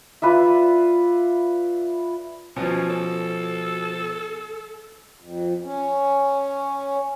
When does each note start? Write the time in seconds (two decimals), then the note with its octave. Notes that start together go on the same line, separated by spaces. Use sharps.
0.22 F4 B4 D5 E5
2.56 B2 F3 C#4
2.89 A4
5.20 F2
5.64 C#4